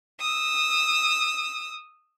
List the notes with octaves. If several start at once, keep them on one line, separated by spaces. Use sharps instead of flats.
D#6 E6